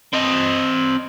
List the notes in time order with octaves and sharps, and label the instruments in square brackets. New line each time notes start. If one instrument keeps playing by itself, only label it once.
[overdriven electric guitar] C4 D#5